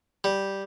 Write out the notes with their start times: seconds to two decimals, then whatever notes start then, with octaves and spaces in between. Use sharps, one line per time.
0.24 G3